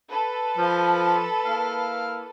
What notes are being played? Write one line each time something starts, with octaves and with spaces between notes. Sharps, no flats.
A4 B4
F3
A#3 E4 F5